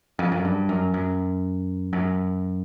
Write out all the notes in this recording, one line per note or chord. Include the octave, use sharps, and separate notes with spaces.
F2
F#2
G2
F#2
F#2
F#2